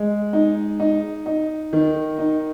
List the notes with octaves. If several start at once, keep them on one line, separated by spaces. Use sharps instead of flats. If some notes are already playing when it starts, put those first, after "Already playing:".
Already playing: G#3
D#4
D#4
D#4
D#3
D#4